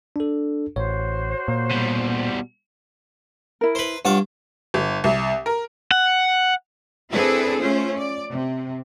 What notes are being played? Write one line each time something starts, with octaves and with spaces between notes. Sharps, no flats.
D4 A4
A1 F#4 C5 C#5
A#2
B2 G3
E4 A#4
B4 C5
G2 F4 C#5 F#5 D6
G1
C2
A#4
F#5
C4 D4 E4 G#4 A4 B4
A3 C#4 F4 C5
D5
C3